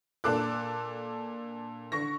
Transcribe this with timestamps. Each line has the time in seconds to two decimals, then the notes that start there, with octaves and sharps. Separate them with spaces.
0.24 A#2 D4 A4 D6 F#6
1.92 D3 C#6 A#6